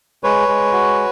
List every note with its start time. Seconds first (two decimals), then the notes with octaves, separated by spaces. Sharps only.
0.24 G#3 B4 C#5
0.48 G#3
0.73 F#4